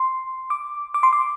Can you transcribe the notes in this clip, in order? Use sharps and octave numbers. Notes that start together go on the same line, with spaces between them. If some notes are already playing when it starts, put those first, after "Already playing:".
Already playing: C6
D6
D6
C6
D6